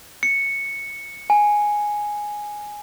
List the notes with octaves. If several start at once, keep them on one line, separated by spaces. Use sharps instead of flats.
C#7
G#5